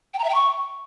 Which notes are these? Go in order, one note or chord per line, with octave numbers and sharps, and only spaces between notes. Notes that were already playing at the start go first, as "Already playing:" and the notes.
G5
A#5
E5
G5
C#6